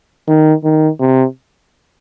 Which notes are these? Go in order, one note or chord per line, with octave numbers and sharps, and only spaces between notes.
D#3
D#3
C3